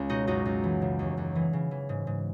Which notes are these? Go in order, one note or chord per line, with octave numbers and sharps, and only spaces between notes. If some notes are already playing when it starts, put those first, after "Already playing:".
Already playing: C#2 C#4
B2 D#4 F#4
F#2 D#4 F#4
F#2
E3
C#3
D#2
D#2
E3
C#3
E3
G#2
G#2